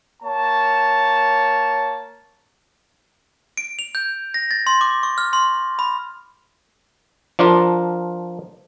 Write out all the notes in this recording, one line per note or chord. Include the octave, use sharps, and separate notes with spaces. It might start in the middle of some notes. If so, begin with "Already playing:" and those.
A#3 C#5 A5
D7
F7
G6
A#6
A6
C6
D6
C#6
F6
C6
B5
F3 D4 F4 A#4